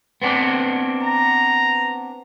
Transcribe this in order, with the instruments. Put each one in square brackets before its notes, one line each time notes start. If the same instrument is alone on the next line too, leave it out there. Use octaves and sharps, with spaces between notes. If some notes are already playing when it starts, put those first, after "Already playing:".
[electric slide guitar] B3 C4 D4
[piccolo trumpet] A#5